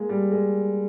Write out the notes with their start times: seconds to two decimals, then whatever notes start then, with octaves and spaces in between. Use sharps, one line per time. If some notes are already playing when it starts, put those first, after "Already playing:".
Already playing: G#3 A#3
0.09 G3
0.32 G#3